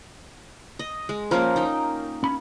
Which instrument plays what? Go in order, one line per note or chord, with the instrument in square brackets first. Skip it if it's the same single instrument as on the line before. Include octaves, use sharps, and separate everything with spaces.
[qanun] D#5
G#3
[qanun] F3 A#3 C#4 [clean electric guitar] A#4
[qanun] D#4 G5
[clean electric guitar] C#4 B5